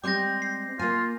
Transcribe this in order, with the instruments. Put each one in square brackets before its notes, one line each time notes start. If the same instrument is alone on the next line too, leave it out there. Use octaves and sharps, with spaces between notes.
[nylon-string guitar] G3 G#3 C4 [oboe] G5 [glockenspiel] D6 G6 A#6
[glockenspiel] C7
[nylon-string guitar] A#3 G#5 [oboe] F4